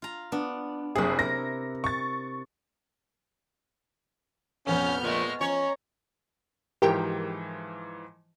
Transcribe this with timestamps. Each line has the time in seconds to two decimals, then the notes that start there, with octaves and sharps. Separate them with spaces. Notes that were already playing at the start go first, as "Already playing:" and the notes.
0.02 F4 A#5
0.32 B3 D4
0.95 F#1 C3 E4 G#4
1.19 A#4 A#6
1.84 C#6 A6
4.67 F1 A#1 F2 B3 C#4 F6 G6
5.04 A#2 G#3 A3
5.41 F3 C#4 C#5 A#5 G#6
6.82 G#2 E3 F3 G4 A#4 G5